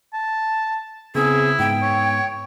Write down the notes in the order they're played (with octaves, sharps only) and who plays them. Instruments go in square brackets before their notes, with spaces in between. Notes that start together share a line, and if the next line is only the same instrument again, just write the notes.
[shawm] A5
[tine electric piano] C#3 B3 C4 [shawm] E4 [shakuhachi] G#4
[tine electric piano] G#2 B3 [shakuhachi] G5
[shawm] C#5